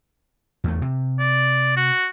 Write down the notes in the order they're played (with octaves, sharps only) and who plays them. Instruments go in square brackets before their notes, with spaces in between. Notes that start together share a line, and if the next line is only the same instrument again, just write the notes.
[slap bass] E2 A3
C3
[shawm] D5
F#4